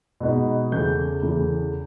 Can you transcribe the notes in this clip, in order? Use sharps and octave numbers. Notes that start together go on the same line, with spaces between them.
B2 G#3 B3 D#4
E2 C#3 E3 A3 G6
E2 C#3 E3 A3